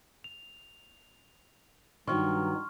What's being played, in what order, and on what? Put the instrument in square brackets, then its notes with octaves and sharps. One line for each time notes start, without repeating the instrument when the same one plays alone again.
[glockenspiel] F7
[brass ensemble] G2 [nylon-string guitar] D#3 F#3 [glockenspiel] C6 C#6 F6